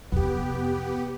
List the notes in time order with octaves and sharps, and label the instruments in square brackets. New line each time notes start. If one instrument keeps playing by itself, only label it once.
[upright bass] F2 C3 [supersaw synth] B3 G4